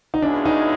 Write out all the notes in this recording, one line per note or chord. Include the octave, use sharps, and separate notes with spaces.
D#4
C#2 B2 G#3 C#4 D4 E4
D#4